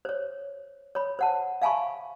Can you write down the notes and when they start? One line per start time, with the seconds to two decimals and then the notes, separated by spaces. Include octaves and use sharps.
0.05 C5 C#5
0.95 C#5 B5
1.19 C5 F#5 A5
1.62 E5 F5 G#5 A5 B5 C#6